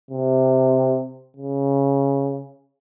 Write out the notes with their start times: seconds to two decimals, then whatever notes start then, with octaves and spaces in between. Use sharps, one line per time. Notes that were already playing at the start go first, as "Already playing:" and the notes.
0.11 C3
1.37 C#3